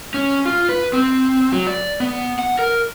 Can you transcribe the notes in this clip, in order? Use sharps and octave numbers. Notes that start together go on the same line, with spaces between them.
C#4
F4
B4
C4
F#3
D5
B3
F#5
A#4